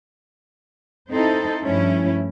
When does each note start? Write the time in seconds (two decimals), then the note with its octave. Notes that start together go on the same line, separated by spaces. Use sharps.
1.10 C4 D#4 E4 A4 C5
1.63 G2 F3 A3 C#4 E4